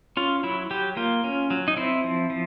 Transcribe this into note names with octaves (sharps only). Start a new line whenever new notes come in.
C#4 F4
F#3 E4
F#3 G4
A#3 F4
C#4
F#3
D#4
C4 E4
F3
F3